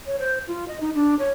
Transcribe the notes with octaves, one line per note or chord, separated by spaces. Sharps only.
C#5
C5
F4
D#5
D#4
D4
C#5